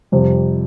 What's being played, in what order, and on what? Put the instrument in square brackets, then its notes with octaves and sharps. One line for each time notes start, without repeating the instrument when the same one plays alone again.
[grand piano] F2 C3 G3